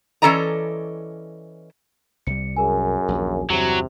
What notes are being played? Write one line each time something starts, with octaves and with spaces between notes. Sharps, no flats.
E3 C#4 A4 D5 D#5 A#5
C2 G3 C#7
F#2 G#4 A#4 G#5
A#1 D#2
E2 G2 C3 F#3